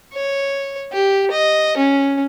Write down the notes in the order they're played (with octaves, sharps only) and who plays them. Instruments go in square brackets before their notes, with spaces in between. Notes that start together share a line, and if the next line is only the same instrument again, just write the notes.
[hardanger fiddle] C#5
G4
D#5
C#4